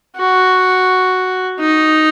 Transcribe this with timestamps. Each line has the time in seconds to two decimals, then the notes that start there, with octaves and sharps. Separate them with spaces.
0.16 F#4
1.59 D#4